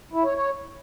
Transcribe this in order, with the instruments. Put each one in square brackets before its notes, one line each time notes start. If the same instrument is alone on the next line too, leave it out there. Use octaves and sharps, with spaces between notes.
[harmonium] E4
C#5
C#5